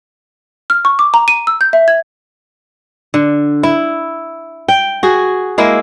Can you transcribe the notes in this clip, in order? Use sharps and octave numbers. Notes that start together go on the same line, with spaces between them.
F6
C#6
D6
A#5
D#7
E6
G6
E5
G#6
D3
E4
G5
F#4 G#4
G#3 A#3 E4